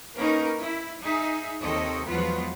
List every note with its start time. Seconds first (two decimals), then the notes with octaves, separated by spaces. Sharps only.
0.17 A#3 C#4 D#4 A#4 B4
0.60 E4
1.03 D#4 G#4 E5
1.61 D#2 C3 C4 A4 C#5 D#5
2.07 E2 F3 F#3 G#3 B3 F4